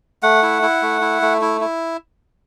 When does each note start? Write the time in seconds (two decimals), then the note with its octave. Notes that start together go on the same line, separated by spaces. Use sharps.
0.23 A3 F#5
0.43 E4
0.62 E4
0.82 A3
1.01 E4
1.22 A3
1.41 E4
1.61 E4